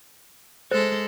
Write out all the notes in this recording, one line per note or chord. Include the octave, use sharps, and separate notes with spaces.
G#3 A4 C5